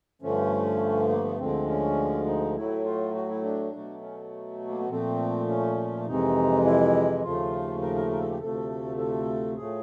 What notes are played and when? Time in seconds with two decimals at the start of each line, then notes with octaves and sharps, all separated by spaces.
0.22 G2 D3 F3 A3 C#4
1.09 A#3
1.24 B3
1.39 D2 D3 F3 G#3 C4
1.68 C#4
2.26 D#4
2.55 A2 F#3 A3 E4
2.85 F4
3.15 F#4
3.29 E4
3.43 D4
3.72 B2 F#3 A3
4.02 C#4
4.68 A#3
4.79 B3
4.89 A#2 F3 A3 C4
5.48 C#4
6.06 F2 C3 E3 G#3 D#4
6.64 E4
7.23 D#2 C#3 F3 A3 F4
7.82 A#4
7.96 A#4
8.11 A#4
8.21 A4
8.30 G4
8.40 D2 C3 F3 A3 A4
8.98 A4
9.57 A2 F3 A3 G#4